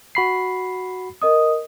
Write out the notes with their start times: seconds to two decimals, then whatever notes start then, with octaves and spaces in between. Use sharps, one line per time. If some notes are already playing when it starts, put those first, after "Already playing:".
0.15 F#4 B5 C7
1.21 A#4 D#5 D#6